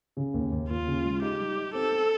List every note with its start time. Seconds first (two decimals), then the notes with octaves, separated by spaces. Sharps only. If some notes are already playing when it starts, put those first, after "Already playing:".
0.17 C#3
0.34 D#2
0.52 D#2
0.69 D#2 F4
0.87 C#3
1.05 G#3
1.22 D#4 G4
1.40 G3
1.57 D#4
1.74 C4 A4
1.92 C4